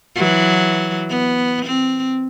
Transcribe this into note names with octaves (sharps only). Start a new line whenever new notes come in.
E3 F#3
B3
C4